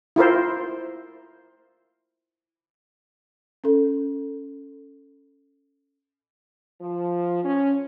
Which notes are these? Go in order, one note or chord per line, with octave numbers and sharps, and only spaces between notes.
E4 F4 A#4 C5
C#4 A4
F3
C#4